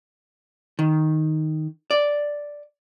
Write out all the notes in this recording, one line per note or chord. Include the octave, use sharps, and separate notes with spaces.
D#3
D5